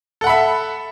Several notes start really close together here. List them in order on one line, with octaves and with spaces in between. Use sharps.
A4 F#5 B5 E5